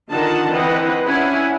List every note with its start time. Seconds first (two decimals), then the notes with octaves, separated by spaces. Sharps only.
0.11 D3 D#3 F4 D#5 F#5 A5
0.51 E3 C4 B4 D#5 F#5
1.06 C#4 D4 E4 F#5 G#5